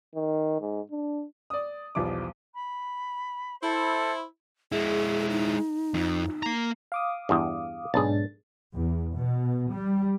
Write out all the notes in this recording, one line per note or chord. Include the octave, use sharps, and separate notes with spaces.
D#3
G#2
D4
D5 D#6
B1 E2 F3 G3 D6
B5
E4 A4 C5
G#3 E4 G#4
D#4
F2 F3
A#3 A#5
F5 D6 D#6
E2 G2
B1 G#2 D4 G#4 A6
E2
B2
G3